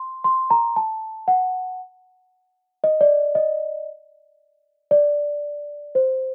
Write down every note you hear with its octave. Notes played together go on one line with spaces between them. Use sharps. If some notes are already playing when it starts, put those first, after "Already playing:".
Already playing: C6
C6
A#5
A5
F#5
D#5
D5
D#5
D5
C5